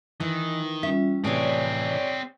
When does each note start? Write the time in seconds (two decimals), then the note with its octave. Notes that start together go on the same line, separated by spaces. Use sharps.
0.20 D#3 E3
0.83 G3 C#4 F4 E5
1.24 A2 C3 E3 C4 G#4 C#5 D5 C#6